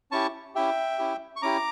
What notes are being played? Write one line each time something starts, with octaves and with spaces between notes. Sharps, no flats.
C#4 E4 G4 A5 C#6
C#4 E4 G4 E5 G5
C#4 E4 G4
C#6
C#4 E4 G4 A#5 D6